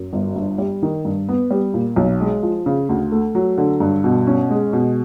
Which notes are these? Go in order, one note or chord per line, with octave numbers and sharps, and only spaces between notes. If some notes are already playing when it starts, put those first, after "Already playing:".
Already playing: F#2
G1
G2
G3
D#3
G2
B3
G3
A#2
B1
G#3
F3
C#3
D2
A3
F#3
D3
G2
B2
C#4
G#3
B2